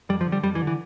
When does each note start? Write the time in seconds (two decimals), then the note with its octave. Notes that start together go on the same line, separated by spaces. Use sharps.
0.09 F2 G3
0.21 F3
0.26 D3
0.32 G3
0.43 F2 G3
0.55 E3
0.62 D3
0.67 E3